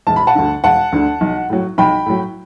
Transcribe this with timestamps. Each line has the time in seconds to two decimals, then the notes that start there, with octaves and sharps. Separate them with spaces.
0.07 E1 A5
0.16 B5
0.27 F#5 A5
0.35 D2 D3
0.64 E1 F#5 A5
0.92 D2 D3
1.21 B1
1.50 A2 F#3
1.78 B1 G5 B5
2.06 A2 F#3